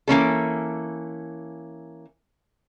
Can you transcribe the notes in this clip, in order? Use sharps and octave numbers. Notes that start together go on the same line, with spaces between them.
E3 A#3 C#4 A4